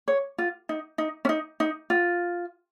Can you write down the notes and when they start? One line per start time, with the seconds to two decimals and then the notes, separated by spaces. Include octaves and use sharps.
0.08 C#5
0.38 F4
0.69 D#4
0.98 D#4
1.25 C#4
1.29 D#4
1.60 D#4
1.90 F4